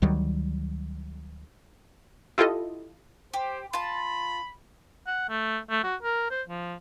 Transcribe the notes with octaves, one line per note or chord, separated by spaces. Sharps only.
D2 D#3 F#3 G3
E4 F4 G4 A4 D#5
G4 C5
F4 A5 B5
F#5
A3
A3
F#4
A#4
C5
F3